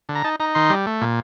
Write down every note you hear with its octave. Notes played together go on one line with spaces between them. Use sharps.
D3
A#5
D#4 A5
D#4 A#5
D#3 C6
G3
A3
A#2